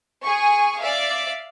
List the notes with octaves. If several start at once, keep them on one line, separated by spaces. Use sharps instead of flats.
G#4 G#5 C#6
D5 E5 F5